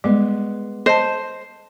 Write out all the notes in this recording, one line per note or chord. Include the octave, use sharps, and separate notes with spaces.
G3 G#3 B3
C5 D#5 A5